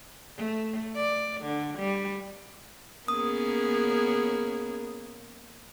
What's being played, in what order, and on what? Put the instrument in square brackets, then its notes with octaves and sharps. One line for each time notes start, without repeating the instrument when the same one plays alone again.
[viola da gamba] A3
D5
D3
G3
[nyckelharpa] A#3 [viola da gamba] B3 C#4 G#4 [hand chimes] D#6